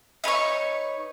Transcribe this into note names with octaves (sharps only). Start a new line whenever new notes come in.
D#4 B4 C#5 C#6